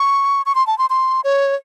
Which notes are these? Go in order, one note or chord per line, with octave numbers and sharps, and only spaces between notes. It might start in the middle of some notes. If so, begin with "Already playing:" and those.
Already playing: C#6
C#6
C6
A5
C6
C6
C#5